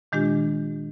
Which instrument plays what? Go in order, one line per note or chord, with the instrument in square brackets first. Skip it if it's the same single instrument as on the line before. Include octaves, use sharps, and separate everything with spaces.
[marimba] A#2 D#3 G#3 D4 F4 G4